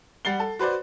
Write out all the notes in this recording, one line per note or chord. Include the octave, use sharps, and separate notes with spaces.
G3 F#5 A6 C7 G7
A4
F#4 B4 C5 D5